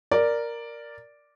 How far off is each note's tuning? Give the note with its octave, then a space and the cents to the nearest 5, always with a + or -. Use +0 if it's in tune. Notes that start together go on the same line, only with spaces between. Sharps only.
A#4 +0 D5 +0